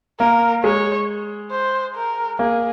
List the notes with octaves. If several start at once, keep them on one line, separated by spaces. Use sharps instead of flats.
A#3 A#4
G#3 C#5
C5
A#4
A#3 G#4